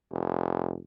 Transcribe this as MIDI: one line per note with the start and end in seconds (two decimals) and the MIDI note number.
0.11 0.80 29